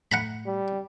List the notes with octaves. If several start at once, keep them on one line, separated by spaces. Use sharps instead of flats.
A2 F#5 A#5 B5
G3